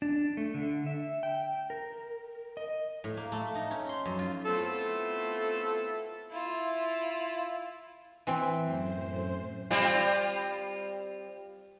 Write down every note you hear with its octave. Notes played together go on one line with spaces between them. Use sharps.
D4
A3
D3
E5
G5
A#4
D#5
A2
A#3
A3
D#4
C#4
C6
F#2
F4
A3 B3 C4 E4 F4 A4
E4 F4
E3 C4
F#2 A2 C5
G3 C4 F4